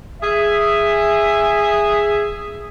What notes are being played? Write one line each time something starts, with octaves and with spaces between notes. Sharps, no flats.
G#4 E5